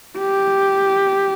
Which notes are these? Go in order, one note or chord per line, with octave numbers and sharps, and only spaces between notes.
G4